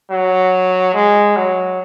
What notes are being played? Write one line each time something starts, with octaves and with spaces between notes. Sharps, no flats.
F#3
G#3
F#3